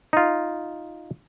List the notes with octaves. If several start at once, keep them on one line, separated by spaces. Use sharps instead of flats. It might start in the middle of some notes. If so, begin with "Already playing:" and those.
D#4 F4